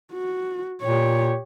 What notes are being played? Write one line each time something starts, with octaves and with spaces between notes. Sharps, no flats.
F#4
A#2 G4 C#5